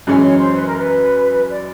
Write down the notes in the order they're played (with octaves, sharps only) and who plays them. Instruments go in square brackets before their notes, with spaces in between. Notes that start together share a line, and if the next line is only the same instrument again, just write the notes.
[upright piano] F#2 C#3 E3 G#3 C#4
[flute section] C#5
C5
B4
A#4
B4
D5